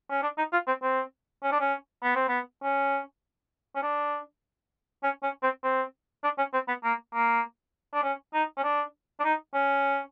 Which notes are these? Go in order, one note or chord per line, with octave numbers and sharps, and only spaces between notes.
C#4
D4
D#4
F4
C4
C4
C#4
D4
C#4
B3
C4
B3
C#4
C#4
D4
C#4
C#4
C4
C4
D4
C#4
C4
B3
A#3
A#3
D4
C#4
D#4
C#4
D4
D4
D#4
C#4